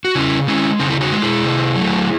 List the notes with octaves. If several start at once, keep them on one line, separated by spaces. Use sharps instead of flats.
F#4
C#3 C#4 E4
G#3 C#4 E4
C#3 C4 D#4
E4
D#4 F#4
G#3
E4 G#4
C3
F#3 A3